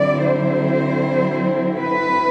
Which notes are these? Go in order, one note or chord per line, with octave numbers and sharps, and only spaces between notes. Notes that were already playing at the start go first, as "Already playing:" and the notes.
Already playing: D3 F#3 C4 E4 D5
C5
B4